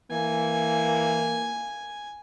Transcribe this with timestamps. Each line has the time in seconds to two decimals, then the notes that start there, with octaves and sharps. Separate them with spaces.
0.11 E3 A#3 G#5